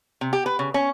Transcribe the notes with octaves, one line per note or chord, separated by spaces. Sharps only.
C3
G4
B4
C#3
C#4